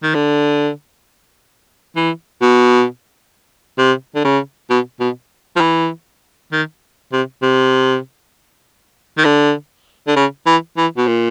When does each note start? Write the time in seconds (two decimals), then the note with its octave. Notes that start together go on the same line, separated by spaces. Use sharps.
0.03 D#3
0.15 D3
1.96 E3
2.42 B2
3.78 C3
4.15 D3
4.24 C#3
4.70 B2
5.00 B2
5.56 F3
5.61 E3
6.52 D#3
7.12 C3
7.42 C3
9.18 D#3
9.25 D3
10.08 D3
10.16 C#3
10.47 E3
10.77 E3
10.97 B2
11.07 A#2